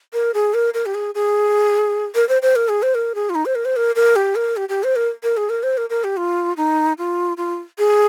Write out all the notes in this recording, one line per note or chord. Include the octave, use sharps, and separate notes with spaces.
A#4
G#4
A#4
A#4
G4
G#4
G#4
A#4
C5
C5
A#4
G#4
C5
A#4
G#4
F4
D#4
C5
A#4
C5
A#4
A#4
G4
A#4
G4
G4
C5
A#4
A#4
G#4
A#4
C5
A#4
A#4
G4
F4
D#4
F4
F4
G#4